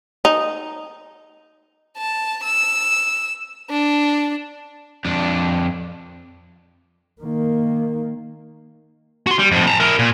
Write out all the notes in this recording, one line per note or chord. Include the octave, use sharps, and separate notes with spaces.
D#4
A5
E6
D4
F2 D4
D#3 A#3
F#4 C6
G3
F2 A2
A5 A#5
E4 A#4
A#2